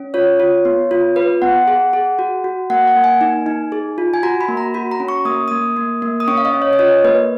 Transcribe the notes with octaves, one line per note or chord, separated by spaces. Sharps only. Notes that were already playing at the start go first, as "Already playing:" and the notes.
Already playing: C#4
F4 C#5
F4
B3
F4
F4 B4
B3 F#5
G#4
G#4
F#4
F#4
A#3 F#5
F#5
A#3
G#5
D#4
D#4
G#4
F4
G#5
F#4 A#5
B5
A#3
A#5
F#4 B5
A#5
C#4
C#6
A#3 D#6
A#3 D#6
A#3
A#3
D#6
C#4 C#6
F5
D#5
C#4
C#5
D#5
F4 C#5
A#3 B4